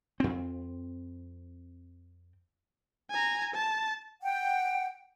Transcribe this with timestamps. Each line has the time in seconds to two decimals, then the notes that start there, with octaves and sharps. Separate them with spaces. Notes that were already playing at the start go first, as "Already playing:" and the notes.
0.20 F2 C4
3.11 G#5 A#5
3.54 A5
4.23 F#5 G5